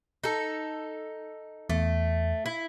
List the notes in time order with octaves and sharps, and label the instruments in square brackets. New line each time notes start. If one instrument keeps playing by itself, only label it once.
[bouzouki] D#4 A4
[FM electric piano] E2 [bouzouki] A3
[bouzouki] E4